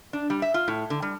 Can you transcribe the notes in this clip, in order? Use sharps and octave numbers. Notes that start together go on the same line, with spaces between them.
D4
G3
E5
F4
A2
D3
G3